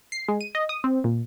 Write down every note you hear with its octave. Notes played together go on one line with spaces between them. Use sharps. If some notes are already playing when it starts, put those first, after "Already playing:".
C7
G#3
D#7
D#5
D#6
C4
A#2